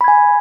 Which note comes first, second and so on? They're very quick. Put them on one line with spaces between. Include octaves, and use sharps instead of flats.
B5 G#6 G#5